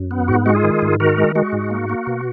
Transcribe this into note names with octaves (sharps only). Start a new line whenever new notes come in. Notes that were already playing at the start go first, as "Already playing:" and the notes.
Already playing: F#2
B3
G#2 F#4
G#3 F#4
F4 G#4
D#3
G#2
D#3 F#4 A#4
G#3
G#3 F#4
G#2
A#3
A#3
B2